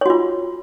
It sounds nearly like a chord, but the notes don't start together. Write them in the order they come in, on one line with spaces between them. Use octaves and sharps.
C#5 F#4 F4